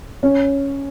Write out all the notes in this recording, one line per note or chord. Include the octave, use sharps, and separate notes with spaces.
C#4